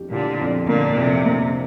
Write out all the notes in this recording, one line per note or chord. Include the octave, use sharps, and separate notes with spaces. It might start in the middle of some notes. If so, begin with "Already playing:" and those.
Already playing: F2 G4
A#2 D3 G4
F2
A#2 D3 A#3
F2 C3
A#3